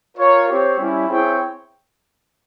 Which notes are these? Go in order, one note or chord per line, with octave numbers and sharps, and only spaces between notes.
F4 A#4 C#5
C4 G4 C#5
G3 C#4 E4
C4 E4 G#4 C#5 G5